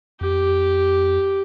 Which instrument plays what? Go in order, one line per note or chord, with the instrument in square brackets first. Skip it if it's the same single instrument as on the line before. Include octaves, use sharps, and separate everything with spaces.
[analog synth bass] F2 [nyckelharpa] G4